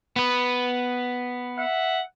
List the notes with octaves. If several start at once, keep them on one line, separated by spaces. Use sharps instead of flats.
B3 B4
E5 F#5